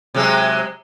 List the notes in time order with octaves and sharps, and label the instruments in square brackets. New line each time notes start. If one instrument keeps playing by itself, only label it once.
[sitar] C3 F#3 G#3